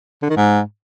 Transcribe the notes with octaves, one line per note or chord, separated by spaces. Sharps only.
D3
D#3
G#2